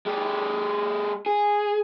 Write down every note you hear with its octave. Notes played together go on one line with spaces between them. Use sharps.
G#3 G4
G#4